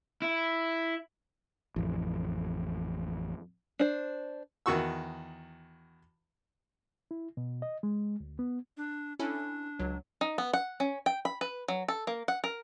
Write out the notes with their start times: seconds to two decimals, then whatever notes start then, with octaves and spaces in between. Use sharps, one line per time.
0.22 E4
1.76 A1 F2
3.79 D4 C5
4.66 E2 D#3 F#4 C#6 E6
7.11 E4
7.37 B2
7.62 D#5
7.83 G#3
8.20 D2
8.39 B3
8.77 D4
9.19 C#4 D4 E4 A4
9.79 C#2 F#3
10.21 D#4
10.38 B3
10.53 F#5
10.80 C#4
11.06 G5
11.25 B5
11.41 B4
11.68 F#3
11.88 A4
12.07 A#3
12.28 F#5
12.44 A#4